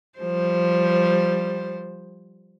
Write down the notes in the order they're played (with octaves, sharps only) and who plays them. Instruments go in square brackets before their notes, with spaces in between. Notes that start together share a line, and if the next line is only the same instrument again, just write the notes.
[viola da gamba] F3 G3 C5